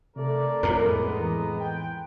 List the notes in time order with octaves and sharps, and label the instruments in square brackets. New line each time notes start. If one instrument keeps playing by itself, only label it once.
[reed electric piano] C3 A4 [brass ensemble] A3 A#4 D5
[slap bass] F2 A2 [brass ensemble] G#3 B3 [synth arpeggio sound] A#4 [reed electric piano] D6
[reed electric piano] E3 A#5
[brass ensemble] G5